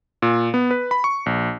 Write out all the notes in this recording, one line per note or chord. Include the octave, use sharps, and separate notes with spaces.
A#2
B3
B4
B5
C#6
A#1